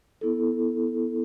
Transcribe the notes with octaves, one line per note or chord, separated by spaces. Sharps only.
B3 E4 A4